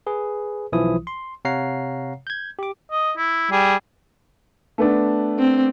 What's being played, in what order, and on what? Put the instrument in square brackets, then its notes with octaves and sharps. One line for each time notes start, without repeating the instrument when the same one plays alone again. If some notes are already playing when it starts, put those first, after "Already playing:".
[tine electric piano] G#4 B4
B1 E3 F3 E4 D#6
C6
C3 C#5 F5 F#5 A#5 C7
G6 G#6
G4 D6
[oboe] D#5
E4
[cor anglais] G3 [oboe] G#4
[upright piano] A3 B3 D4
[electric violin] C4